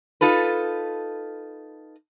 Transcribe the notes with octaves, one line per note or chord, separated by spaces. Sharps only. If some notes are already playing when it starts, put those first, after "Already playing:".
D#4 F4 A4 B4